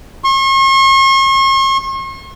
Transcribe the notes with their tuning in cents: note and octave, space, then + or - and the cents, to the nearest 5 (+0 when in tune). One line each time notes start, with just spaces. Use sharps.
C#6 -45